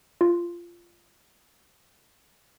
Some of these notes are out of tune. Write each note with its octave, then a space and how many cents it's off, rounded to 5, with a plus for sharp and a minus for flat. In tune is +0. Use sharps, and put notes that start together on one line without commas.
F4 -15